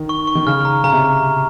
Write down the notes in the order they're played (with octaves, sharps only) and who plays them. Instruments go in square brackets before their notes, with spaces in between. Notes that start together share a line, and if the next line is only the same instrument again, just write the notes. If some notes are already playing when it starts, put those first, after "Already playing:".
Already playing: [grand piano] D#3
[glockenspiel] C#6
C#6
[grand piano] D#3
[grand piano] C#3 [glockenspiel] F6
[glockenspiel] A#5
[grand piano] C#3 [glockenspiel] A#5
[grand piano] C3